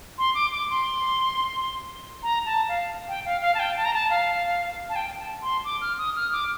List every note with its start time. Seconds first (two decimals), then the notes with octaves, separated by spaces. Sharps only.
0.18 C6
0.34 D6
0.52 D6
0.69 C6
2.23 A#5
2.45 A5
2.68 F5
3.08 G5
3.25 F5
3.42 F5
3.55 A5
3.59 G5
3.76 A5
3.85 A#5
3.94 A5
4.10 F5
4.89 A5
4.96 G5
5.18 A5
5.41 C6
5.64 D6
5.81 F6
5.98 D#6
6.15 F6
6.32 D6